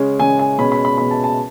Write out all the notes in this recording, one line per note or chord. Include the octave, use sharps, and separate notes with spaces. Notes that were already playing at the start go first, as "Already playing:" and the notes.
Already playing: C#3 G#3 C#4
C#3 G#3 C#4 G#5
G#5
B2 G#3 C#4 B5
B5
B5
B2 G#3 C#4 B5
A5
A5